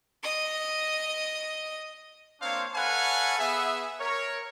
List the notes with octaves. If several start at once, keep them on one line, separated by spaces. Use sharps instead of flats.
D#5 D#6
A#3 C4 D4 C5 C#5 F5
A4 B4 C#5 F5 F#5 G#5
B3 G#4 E5
A#4 C#5